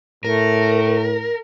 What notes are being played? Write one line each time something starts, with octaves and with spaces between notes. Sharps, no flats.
A2 A3 A#4